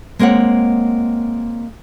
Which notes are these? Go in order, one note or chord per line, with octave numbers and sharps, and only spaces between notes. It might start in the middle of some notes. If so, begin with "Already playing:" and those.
G#3 A#3 C4 C#5 F#5